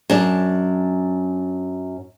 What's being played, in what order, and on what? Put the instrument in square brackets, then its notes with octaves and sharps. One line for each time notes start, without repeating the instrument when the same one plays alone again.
[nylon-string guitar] F#2 D4